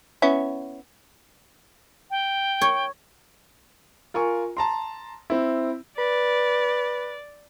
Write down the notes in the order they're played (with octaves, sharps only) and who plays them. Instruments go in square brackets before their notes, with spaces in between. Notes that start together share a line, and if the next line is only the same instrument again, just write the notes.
[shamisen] B3 C#4 E4
[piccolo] G5
[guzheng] C#5
[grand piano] F4 A#4 G#5 C#6
A5 A#5 C6
C4 E4
[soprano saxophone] B4 [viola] D5